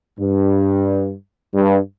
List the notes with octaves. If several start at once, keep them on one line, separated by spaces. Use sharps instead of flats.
G2
G2